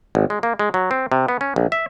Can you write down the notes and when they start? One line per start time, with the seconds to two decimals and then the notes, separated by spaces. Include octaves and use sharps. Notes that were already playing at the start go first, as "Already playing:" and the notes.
0.15 G#1
0.30 G#3
0.43 A#3
0.59 G#3
0.74 F#3
0.91 C4
1.12 C3
1.28 B3
1.41 C#4
1.56 A#1
1.72 E5